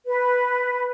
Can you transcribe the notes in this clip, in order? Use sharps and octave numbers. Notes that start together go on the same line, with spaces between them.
B4